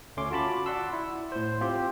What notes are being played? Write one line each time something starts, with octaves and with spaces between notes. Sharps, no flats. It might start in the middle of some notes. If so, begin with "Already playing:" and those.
D2 A3 C#4 C6 D6
F4 F#4 A5 B5 D6
D5 F#5 C6 E6
E4
A2 C5
C4 F4 G4 C5